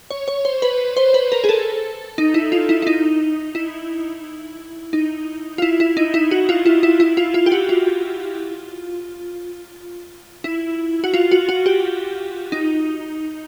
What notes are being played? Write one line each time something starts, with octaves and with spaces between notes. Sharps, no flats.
C#5
C#5
C5
B4
C5
B4
A#4
G#4
A4
D#4
E4
F4
E4
E4
D#4
E4
D#4
F4
E4
E4
D#4
E4
F#4
F4
E4
E4
E4
F4
F4
G4
F#4
F4
E4
F#4
F4
F#4
F#4
G4
D#4